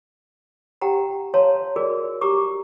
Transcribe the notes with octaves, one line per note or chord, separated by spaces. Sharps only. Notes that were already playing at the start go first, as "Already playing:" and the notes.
G4 F#5 G5 A#5
C#5 F5 A5 A#5 C6
F#4 G#4 A#4 D5
G4 A#5 C#6 D6